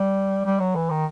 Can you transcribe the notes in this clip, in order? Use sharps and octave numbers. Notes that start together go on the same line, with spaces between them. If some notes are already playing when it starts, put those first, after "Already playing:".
Already playing: G3
G3
F#3
E3
D#3